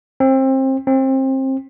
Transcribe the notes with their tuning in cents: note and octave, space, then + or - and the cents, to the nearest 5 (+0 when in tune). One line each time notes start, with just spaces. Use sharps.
C4 +25
C4 +25